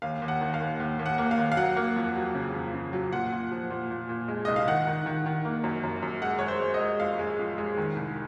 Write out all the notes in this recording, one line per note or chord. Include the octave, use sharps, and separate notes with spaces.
D#2 F5
D#2
F#5
D#3
F5
D#2
D#2
D#2
F#5
A#3
F5
D#2
F5
F#3 F#5
A#3
F2
F#3
C#3
F2
C#3
F#3
A#2 F#5
A#2
F3
A#2
A#2
A#2
G#3
C2 D#5
F5
D#3 F#5
D#3
D#3
D#3
A#3
F#2
F#2
F#2
G#3 F#5
G#3 C#5
C5
G#3
D#5
G#3
F2 F5
G#3
F2
G#3
D#3
C2